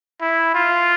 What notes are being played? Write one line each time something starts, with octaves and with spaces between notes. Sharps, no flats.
E4
F4